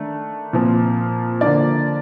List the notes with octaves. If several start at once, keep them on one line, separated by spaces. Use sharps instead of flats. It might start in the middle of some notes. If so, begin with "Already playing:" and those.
Already playing: D#3 A3 D4
A#2 F3 C4
D3 F3 A#3 D4 D5